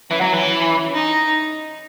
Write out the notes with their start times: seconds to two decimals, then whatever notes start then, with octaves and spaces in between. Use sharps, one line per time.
0.10 E3 C#4
0.21 F#3
0.33 E3
0.93 D#4